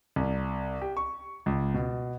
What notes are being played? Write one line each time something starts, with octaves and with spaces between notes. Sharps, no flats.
C2
G4
C#6
C#2
B2